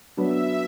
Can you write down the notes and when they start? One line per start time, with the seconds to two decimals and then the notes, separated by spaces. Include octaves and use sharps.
0.17 F#3 B3 D4 E5